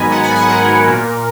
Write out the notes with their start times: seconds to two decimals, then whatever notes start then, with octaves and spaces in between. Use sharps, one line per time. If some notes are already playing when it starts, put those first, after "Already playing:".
Already playing: G#2 D#3 F#3 B3 G#5 A#5 B5
0.12 B3 F#5
0.23 G#5
0.31 G#2 F#5
0.49 D#3 A#4
0.69 G#2
0.88 A#2